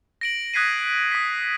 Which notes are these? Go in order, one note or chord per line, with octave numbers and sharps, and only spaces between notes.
A#6 D7 F#7
D#6 F#6 G#6 B6 C7 D#7
D#6 B6